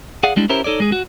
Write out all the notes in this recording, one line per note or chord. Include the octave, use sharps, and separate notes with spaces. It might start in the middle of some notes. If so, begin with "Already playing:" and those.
G#4 D5 F5 F#5
G3 G#3 D4 E4
C#4 E4 G4 A#4 C5 C#5
D#4 A4 C#5 D5
G#3 G#4
F#4